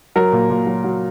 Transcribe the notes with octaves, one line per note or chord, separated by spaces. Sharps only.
F#3 A#4
A#2
A#2
F#3
F#3